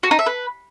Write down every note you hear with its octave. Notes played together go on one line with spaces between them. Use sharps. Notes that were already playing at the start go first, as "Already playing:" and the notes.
F#4
D#4
E5
B4